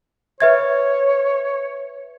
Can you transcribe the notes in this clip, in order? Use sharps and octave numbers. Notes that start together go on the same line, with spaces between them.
B4 C#5 E5 G#6